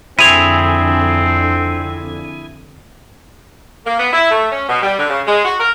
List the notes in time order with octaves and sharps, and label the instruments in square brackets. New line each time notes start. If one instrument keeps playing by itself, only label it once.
[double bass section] F2 D3 [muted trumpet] C4 [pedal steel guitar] E4 G#4 G#5 [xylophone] D#7 F7
[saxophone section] A#3
B3
E4
A3
C#4
B2
G3
D3
C#3
G#3
F#4
A#4